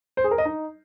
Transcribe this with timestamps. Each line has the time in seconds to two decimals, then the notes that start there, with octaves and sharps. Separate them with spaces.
0.17 C5
0.24 G#4
0.31 A#4
0.38 D#5
0.45 D#4